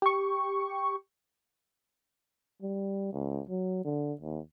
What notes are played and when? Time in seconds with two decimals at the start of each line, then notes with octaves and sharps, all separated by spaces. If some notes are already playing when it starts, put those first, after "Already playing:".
0.02 G4 C#6
2.62 G3
3.13 C#2
3.49 F#3
3.85 D3
4.21 D#2